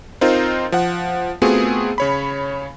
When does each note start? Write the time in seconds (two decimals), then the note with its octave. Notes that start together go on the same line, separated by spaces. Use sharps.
0.21 C4 D#4 F4 A#4 C5
0.72 F3 F#5
1.42 A3 B3 C4 F4 F#4 G#4
1.98 C#3 C#5 B5